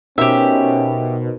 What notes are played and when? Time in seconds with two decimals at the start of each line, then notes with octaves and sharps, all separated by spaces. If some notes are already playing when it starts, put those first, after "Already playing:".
0.18 B2 C#4 D#4 G4 A#4 C5 E5